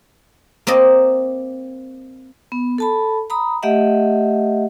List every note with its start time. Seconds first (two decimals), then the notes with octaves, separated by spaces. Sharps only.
0.67 A#3 C4 D5 D#5
2.52 B3
2.78 A4 A5 B5
3.30 A#5 B5 D#6
3.63 A3 G4 D#5 E5 F#5